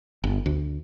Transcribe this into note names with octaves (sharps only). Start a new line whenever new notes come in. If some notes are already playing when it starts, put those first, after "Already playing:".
G1
D2